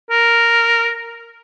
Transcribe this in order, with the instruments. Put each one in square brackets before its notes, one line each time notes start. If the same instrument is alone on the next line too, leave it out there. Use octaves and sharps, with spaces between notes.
[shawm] A#4